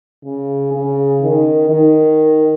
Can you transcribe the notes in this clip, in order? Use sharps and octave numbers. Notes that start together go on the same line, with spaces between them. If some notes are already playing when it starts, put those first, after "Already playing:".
C#3
C#3
D#3
D#3